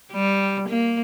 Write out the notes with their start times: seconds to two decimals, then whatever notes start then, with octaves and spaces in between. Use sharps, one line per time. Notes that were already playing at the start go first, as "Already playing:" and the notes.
0.12 G3
0.68 A#3